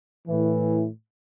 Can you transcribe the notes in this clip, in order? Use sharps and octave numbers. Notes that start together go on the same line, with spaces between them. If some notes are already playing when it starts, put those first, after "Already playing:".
A2 E3